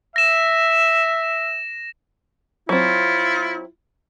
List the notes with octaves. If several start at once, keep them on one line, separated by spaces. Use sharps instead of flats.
E5 A#6 E7
F#3 C4 E4 F4